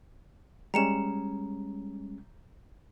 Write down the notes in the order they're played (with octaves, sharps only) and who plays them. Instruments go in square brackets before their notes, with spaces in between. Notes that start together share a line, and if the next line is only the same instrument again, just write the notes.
[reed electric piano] G3 G#3 C#4 [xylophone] A#5 C#7 E7